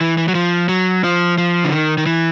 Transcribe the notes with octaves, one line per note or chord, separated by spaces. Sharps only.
E3
E3
F#3
F3
F#3
F3
F3
D3
D#3
D#3
E3